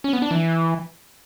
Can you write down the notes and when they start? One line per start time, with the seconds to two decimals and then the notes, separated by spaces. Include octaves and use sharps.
0.04 C#4
0.13 B3
0.22 D4
0.31 E3